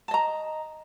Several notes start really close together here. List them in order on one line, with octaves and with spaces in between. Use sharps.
A5 D#5 A#5